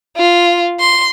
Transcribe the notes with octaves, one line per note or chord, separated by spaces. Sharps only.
F4
C6